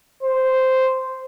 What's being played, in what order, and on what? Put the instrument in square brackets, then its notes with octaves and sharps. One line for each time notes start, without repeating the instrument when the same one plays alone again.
[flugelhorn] C5